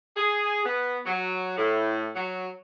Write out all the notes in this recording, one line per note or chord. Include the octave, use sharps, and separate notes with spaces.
G#4
B3
F#3
A2
F#3